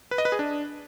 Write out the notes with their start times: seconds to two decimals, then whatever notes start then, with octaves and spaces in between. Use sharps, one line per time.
0.11 B4
0.18 D#5
0.25 B4
0.32 G#4
0.39 D4